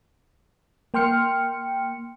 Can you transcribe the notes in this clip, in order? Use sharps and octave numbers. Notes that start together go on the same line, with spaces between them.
A#3 G5 C6 F6 C#7